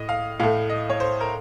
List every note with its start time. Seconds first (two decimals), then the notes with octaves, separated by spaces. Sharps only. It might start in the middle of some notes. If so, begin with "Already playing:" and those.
Already playing: A2 D#5
0.09 F5
0.40 A2 A3 F5
0.69 D#5
0.90 C#5
1.00 C5
1.20 A#4